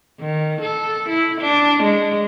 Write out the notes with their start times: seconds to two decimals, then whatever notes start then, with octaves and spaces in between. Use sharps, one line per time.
0.21 D#3
0.61 A4
1.09 E4
1.41 D4
1.83 G#3